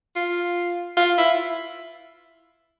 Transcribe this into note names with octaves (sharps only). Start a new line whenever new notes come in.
F4
F4
E4